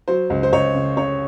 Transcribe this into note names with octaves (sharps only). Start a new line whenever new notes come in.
F#3 C5
C#2
C5
C#2 C#5
C#3
C#3 C#5